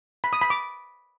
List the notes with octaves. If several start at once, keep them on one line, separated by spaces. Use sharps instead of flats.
B5
D#6
B5
D6